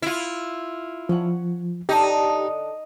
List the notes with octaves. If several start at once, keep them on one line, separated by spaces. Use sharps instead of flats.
E4 F4
F3 C#4 F#5
D3 D4 D#4 G4 A4